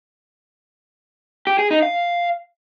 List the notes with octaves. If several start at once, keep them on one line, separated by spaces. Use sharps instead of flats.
G4
G#4
D#4
F5